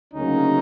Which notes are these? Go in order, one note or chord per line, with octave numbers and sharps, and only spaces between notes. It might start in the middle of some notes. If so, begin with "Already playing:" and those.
D2 C#3 F#3 A#3 C#4 D#4